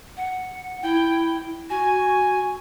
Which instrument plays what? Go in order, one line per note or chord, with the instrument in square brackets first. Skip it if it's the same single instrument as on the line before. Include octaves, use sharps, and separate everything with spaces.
[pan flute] F#5
[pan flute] E4 [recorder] G5
[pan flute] F#4 [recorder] G#5